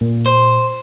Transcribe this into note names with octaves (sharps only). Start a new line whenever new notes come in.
A#2
C5